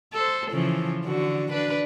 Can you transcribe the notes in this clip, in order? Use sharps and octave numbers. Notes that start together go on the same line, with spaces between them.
A4 C5
C#3 E3 F3
D3 F#4
D4 B4